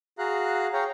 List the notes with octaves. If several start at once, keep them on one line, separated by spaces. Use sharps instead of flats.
F#4 G#4 F5 A#5 F#6
G#4 C#5 F5 G5 A#5